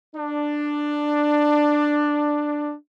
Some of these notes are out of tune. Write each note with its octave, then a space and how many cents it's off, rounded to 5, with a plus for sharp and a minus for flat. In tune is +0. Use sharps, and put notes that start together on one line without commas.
D4 +10